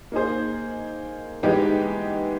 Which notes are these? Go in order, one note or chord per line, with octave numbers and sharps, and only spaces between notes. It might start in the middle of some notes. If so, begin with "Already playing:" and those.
A#3 D#4 G#4 C5
E3 G#3 B3 D#4 G4